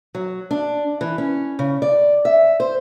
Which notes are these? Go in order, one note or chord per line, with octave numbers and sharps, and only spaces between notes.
F#3
D4
E3
C#4
C#3
D5
E5
C5